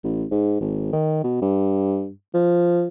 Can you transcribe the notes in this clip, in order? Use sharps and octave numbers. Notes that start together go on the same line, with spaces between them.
A1
G#2
G#1
D#3
B2
G2
F3